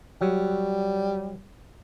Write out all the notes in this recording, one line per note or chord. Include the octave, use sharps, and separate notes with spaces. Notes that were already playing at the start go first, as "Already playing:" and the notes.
F#3 G3